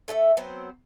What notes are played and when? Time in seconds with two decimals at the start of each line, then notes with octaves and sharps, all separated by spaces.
0.08 A3 A4 D5 E5
0.37 F#3 B3 C4 C5